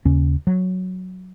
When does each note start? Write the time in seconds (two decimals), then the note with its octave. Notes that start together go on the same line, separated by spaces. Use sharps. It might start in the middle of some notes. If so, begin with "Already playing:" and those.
0.05 D#2 C#3 C#4
0.47 F#3